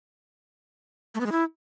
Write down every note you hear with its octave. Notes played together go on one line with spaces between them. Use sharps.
A3
B3
G#3
E4